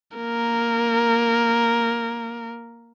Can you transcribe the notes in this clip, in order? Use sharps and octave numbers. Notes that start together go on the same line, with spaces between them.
A#3 A#4